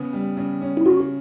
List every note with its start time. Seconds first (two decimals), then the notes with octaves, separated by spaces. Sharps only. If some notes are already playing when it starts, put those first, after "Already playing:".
Already playing: C#3 B3
0.13 G3
0.37 C#3
0.61 C#4
0.77 E4
0.86 C#3 F#4